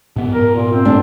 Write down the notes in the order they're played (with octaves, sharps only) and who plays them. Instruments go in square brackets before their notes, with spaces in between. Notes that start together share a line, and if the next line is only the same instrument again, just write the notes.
[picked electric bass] G#2 B3
[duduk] A#4
A#2
C4
[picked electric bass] F#1 G2 A3 [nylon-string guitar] D4